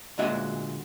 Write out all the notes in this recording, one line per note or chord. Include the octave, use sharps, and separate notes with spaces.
D2 A#2 G#3 F#4 D#5 E5